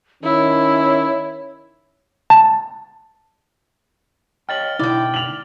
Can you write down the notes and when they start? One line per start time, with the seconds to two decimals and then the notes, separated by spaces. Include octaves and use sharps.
0.24 D#3 C#4 E4 C#5
2.30 A5
4.49 C#5 D#5 G5 F6 A6 F#7
4.79 B2 D3 D#4 E4 D5 G5
5.14 F7 F#7